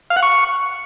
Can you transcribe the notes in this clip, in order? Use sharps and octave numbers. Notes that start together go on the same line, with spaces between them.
F5
F#5
C#6